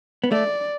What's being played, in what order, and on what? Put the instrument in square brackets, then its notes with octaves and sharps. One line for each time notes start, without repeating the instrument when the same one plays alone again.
[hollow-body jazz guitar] B3
[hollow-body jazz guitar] A3 [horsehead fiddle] D5